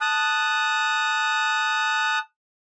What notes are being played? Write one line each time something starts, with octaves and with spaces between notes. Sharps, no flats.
A5 D#6 F#6